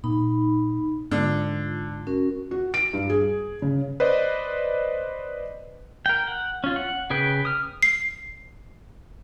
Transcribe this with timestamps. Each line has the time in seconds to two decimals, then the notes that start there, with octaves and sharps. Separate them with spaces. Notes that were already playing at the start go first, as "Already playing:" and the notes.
0.04 A#2 D#4 B5
1.11 G#2 D3 F4
2.07 C#4 F#4 A#4
2.51 F#4
2.74 D7
2.93 G2
3.09 G#4
3.62 C#3
4.00 B4 C5 D5 D#5
6.06 A#4 G5
6.27 F#5
6.64 C#4 F4
6.76 F#5
7.10 C#3 G#4 B4 G5
7.45 D#6 F6
7.83 C7